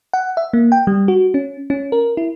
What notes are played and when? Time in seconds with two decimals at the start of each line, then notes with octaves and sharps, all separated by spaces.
0.13 F#5
0.37 E5
0.53 A#3
0.72 G5
0.87 G3
1.08 F#4
1.34 C#4
1.70 C#4
1.92 A#4
2.17 E4